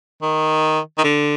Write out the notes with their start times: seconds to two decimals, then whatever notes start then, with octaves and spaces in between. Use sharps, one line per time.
0.22 D#3
0.98 D#3
1.04 D3